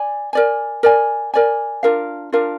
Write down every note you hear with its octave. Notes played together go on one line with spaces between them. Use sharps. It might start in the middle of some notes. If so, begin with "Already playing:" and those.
Already playing: D5 G#5
A#4 D5 G#5
A#4 D5 G#5
A#4 D5 G#5
D4 F4 A#4 F5
D4 F4 A#4 F5